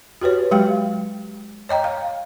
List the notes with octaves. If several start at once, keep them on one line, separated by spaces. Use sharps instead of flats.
F#4 G4 B4 C#5
F#3 G#3 G4 F5 G5
C#5 D#5 G5 A#5
F5